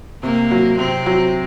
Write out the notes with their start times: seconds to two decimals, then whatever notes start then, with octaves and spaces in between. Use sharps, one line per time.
0.23 C3 A#3
0.51 F#3
0.78 C3 C4
1.06 F#3